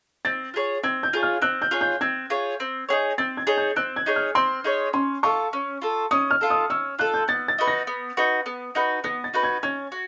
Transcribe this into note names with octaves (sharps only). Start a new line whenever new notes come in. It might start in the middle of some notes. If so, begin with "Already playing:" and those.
C4 A6
F4 G#4 C#5
C4 G#6
G6
F4 G#4 C#5
F6
C4 F#6
G6
F4 G#4 C#5
G6
C4 G#6
F4 G#4 C#5
C4
D#4 G#4 C#5
C4 A6
G#6
D#4 G#4 C#5
G6
C4 F#6
G#6
D#4 G#4 C#5
F6
C4 C6
D#4 G#4 C#5
C#4 C6
F4 A4 C#6
C#4
F4 A4
C#4 D#6
F6
F4 A4
D#6
C#4 E6
F4 A4 F#6
G6
B3 A6
A6
D#4 F#4 B4
A#6
B3
D#4 F#4 B4
B3
D#4 F#4 B4
B3 A#6
A6
D#4 F#4 B4
G#6
C#4 G#6
F#4